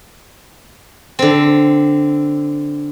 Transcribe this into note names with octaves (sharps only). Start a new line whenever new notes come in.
D3 C4